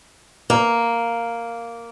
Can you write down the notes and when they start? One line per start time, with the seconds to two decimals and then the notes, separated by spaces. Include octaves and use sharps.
0.50 A#3